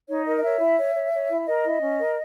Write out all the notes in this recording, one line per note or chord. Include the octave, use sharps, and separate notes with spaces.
D#4 C#5
A#4 D#5
D#5
C#5 E5
E4
C#5
C#5
C#5
E4
A#4 D#5
E4
C#4
A#4